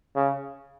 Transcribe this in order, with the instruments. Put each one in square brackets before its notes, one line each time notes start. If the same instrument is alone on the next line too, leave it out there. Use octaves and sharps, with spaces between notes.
[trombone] C#3